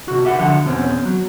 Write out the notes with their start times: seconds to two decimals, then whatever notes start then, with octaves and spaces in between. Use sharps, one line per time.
0.08 C3 F#4
0.25 G4 E5 F#5
0.39 D3 F3 F#5
0.64 B1 E2 B2 C4 C#4
1.05 F#3